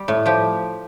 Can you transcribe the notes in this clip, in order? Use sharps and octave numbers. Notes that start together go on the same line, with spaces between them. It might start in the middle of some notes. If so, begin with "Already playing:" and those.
Already playing: G3
A2
F3 G4